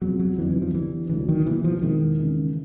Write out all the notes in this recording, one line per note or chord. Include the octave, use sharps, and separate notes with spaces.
E2 C3 F3 F#3
F#3
F2 D3 E3 F#3 B3 D#4
E3
F3
D3 E3 G3 B3
D2 D3 E3 F#3 A3
D#3
B2 E3 G3 A#3
F3
E2 B2 D#3 G#3 B3 E4
C#3 E3 G#3